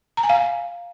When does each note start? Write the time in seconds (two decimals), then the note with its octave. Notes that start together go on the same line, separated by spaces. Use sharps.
0.17 A#5
0.23 G#5
0.29 F5